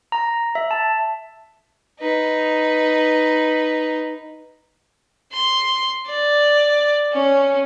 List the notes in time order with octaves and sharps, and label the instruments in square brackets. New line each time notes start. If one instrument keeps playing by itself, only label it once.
[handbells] A#5
E5
A5
[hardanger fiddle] D#4 B4
[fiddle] C6
D5
C#4